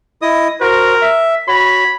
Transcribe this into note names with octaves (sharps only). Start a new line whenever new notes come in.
E4 D#5 D#6
F#4 A#4 C5
E5
F#4 C#5 B5